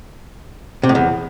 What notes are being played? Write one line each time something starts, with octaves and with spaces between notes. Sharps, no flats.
C3
A2
E2